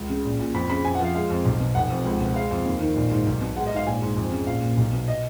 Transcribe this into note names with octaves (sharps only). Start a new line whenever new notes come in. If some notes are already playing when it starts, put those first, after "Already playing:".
Already playing: C#2
C#3
A#1
A#2
F2 B5
C#3 B5
F2 G#5
F#5
F3 F5
G#3 F5
F2
B1
B2
F1 F#5
F2
C#2
B2
G#3 F5
F2
D#2
D#3
A#1
G#2
B1
B2
G#3 F#5
D#5
G#2 F5
A#1 G#5
G#2
F2
C#3
A#1 F5
A#2
B1
B2
D#5